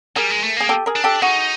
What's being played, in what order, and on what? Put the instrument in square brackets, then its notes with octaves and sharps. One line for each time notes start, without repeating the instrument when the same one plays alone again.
[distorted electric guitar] G3 [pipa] G#4 A#4
[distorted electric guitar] G#3
A3
[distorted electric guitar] A#3 [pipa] G#4
[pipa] G4 A4
G#4 A#4
[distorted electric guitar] D4
[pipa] G4 A4
[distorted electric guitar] D#4 [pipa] F#4 G#4